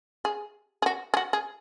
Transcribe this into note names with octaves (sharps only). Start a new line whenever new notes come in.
G#4
G#4
F#4
G#4
F#4
G#4